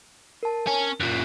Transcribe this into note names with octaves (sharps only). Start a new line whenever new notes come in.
A#4 A5
C#4
F#2 A#2 F#6